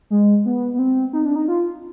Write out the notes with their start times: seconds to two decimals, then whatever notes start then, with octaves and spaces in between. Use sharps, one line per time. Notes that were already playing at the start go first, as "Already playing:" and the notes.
0.10 G#3
0.46 B3
0.74 B3
0.79 C4
1.13 D#4
1.25 D4
1.36 D#4
1.48 F4